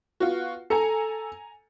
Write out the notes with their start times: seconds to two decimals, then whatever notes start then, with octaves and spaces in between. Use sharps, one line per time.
0.20 B3 F4 F#4
0.70 A4 G#5 A#5 C#7